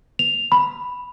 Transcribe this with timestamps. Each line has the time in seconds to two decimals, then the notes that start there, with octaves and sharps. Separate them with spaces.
0.19 F7
0.52 B5